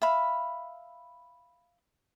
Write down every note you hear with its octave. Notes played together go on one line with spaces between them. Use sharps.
E5 F5 B5